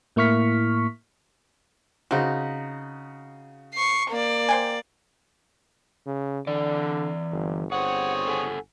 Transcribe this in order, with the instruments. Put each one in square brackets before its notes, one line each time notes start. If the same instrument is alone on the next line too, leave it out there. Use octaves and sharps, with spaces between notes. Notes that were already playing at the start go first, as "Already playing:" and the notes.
[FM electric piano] A2 A#3 E4 C#6 F6 B6
[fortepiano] C#3 F#4 [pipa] C4 D#4
[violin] C#6 C7
A#3 D5
[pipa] C5 G5 G#5
[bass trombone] C#3
[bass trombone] D3 [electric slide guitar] E3 D5
[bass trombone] G1
[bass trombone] G1 [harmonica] C4 G#4 C#5 [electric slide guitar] F#5
[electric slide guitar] A4 F#5 G#5